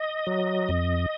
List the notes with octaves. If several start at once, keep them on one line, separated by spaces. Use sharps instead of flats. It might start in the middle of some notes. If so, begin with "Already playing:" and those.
Already playing: D#5
F#3
F2